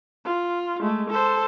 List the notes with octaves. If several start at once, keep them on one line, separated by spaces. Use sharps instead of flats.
F4
G#3 A3
A4 C5